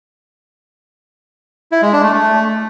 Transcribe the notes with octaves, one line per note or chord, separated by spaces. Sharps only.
E4
G#3
D4
A3
A3